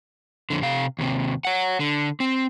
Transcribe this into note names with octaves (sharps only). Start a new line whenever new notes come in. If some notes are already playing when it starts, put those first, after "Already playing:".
F2 D3
C3 F5
D#2 C3
C#5 F#5
D3
C4